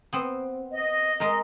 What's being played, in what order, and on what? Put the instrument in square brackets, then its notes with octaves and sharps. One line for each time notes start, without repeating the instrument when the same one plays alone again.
[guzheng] B3 C4
[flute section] D#5
[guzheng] G#3 A#4